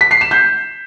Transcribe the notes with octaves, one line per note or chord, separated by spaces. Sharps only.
B6
C7
E7
G6